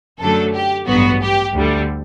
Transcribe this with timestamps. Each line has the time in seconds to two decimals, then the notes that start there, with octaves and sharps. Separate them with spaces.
0.20 F#2 D3 F#3 A3 A4
0.54 G4
0.87 A1 G2 F#3 B3 F#4
1.22 G4
1.55 D2 D3 G3